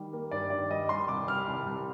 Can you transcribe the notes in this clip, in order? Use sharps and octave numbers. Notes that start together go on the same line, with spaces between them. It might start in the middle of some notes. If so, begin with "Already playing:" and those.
Already playing: D#3 G3
A#3
G2 D5
D#3 D5
G3 D#5
G3 C6
C2 D6
G3 F6
C2
C2